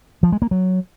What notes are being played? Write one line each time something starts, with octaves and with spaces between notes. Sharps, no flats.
F3
G#3
A#3
F#3